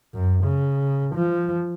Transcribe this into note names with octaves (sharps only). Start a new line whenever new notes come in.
F#2
C#3
F3